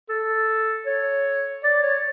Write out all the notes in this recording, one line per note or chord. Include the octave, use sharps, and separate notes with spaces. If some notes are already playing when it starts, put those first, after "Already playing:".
A4
C#5
D5
C#5